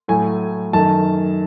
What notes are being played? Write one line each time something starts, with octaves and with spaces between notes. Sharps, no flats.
A2 F#3 A3 G#5
F#2 D#3 A3 A5